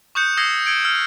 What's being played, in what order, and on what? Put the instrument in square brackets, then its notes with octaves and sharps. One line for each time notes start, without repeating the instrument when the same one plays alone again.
[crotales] C#6 D#6 F#6 G6 C#7
D#6 E6 G#6 A#6 C7 C#7
E6 G#6 C#7 D7
E6 F6 C#7